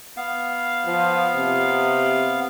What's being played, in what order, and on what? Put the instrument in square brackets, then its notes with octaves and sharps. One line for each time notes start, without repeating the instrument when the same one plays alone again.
[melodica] B3 F5
[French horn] F3
C3